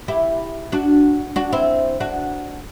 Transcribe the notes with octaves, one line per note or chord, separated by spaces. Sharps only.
E4 G4
D4 F#4
D4 F#4
C4 E4
D4 F#4